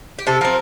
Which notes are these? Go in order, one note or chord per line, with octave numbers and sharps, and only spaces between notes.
G4
C3 A4
F3 C4 A#4